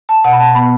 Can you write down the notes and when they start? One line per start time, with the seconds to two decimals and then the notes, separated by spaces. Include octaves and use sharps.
0.09 A5
0.24 B2 F#5
0.32 B5
0.40 A5
0.55 B3 B5